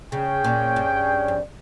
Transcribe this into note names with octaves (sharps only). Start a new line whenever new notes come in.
C#3 C#4 G#4 C#5 G5
A#2
G2
F2